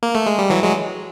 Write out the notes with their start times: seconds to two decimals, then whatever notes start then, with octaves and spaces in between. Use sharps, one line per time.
0.03 A#3
0.15 A3
0.27 G#3
0.39 G3
0.50 E3 F#3
0.63 F#3 G#3